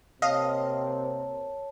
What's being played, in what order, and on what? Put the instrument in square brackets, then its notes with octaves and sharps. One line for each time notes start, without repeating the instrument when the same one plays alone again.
[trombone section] C3 A#3 C4 [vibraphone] C#5 A5 [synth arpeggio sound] D#5 F5